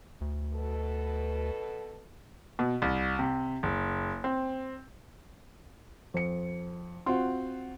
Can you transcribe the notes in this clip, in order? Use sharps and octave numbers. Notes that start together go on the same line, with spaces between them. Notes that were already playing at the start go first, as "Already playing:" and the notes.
D2
B2 A4 B4
B2
C2
C3
F#1
C4
F2 C#7
C4 F4 F#4 F#5 C6